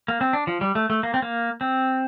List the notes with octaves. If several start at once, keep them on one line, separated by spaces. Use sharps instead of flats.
A#3
C4
D4
F3
G3
A3
A3
A#3
C4
A#3
C4